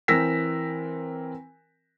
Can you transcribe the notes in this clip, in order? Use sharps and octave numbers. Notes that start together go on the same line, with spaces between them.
E3 C4 A#4 E6 A#6 B6